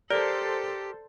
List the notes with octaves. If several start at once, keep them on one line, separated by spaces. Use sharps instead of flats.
G4 A4 A#4 C5 D5